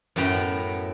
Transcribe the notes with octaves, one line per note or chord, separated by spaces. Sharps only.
F#2 A2 B3 G5 A#5 B5